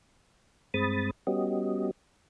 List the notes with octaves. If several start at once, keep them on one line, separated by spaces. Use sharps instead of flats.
G2 G#3 C4 B5 D#6 A6
G3 B3 C#4 F#4 G4 D#5